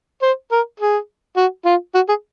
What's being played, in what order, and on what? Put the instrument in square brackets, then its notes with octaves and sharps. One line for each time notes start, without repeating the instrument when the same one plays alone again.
[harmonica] C5
A#4
G#4
F#4
F4
F#4
G#4